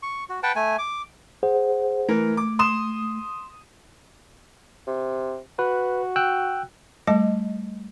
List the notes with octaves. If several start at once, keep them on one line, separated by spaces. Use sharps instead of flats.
C#6
F#4
B4 F#5 G5 A5
A3 G#5
D6
G#4 C5 F#5
E3 A3 A#4
D6
C6 D#6 E7
C3
F#4 B4
G5 E6 F#6
G3 A3 D#5 A5